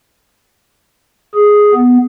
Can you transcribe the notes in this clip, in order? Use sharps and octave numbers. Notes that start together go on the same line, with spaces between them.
G#4
B3